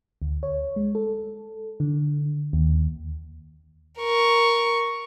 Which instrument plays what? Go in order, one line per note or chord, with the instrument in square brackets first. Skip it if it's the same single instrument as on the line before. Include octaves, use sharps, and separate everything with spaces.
[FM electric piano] D2
C#5
G#3
A4
D3
D#2
[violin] A#4 C#6